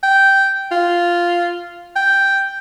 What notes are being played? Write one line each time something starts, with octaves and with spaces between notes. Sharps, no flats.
G5
F4
G5